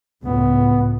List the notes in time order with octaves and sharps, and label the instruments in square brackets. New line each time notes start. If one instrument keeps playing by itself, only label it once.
[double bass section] C#2 A2 [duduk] B3